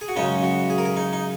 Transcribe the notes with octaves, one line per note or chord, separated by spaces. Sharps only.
G#4
F#4
F#2 C#3 G#3 C#4 D#4
F#4
G#4
A#4
G#4
D#4
D#4